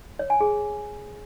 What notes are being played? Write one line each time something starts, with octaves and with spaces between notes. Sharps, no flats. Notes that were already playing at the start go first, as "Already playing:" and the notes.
C#5
G#5
G#4